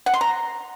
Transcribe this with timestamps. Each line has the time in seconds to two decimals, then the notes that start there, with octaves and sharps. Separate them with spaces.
0.06 F#5
0.14 C6
0.21 A#5